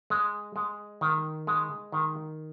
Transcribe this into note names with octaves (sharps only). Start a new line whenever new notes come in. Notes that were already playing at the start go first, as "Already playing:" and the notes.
G#3
G#3
D#3
G#3
D#3